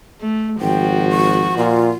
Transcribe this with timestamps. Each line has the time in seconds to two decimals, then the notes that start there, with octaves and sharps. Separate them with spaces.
0.21 A3
0.61 G#1 F3 F#4 G5
1.10 C#6
1.57 A#2 F4